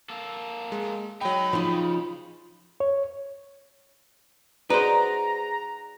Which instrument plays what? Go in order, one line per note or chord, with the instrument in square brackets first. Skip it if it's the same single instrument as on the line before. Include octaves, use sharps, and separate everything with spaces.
[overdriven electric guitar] A#3 A4
[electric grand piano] G#3
[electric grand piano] F#3 G5 [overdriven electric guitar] D#4 [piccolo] B5
[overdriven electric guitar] C#3 [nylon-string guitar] F3 D#4
[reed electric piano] C#5
[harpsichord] G#3 [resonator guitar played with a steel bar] D#4 F#4 D5 [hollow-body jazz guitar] B4 C5 [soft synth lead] A#5